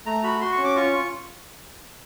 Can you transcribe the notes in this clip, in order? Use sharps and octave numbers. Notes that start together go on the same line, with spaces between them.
A3 A#5
F#4 B5
F#4 C6
C#6
C#4
D6
F4 C#6
F4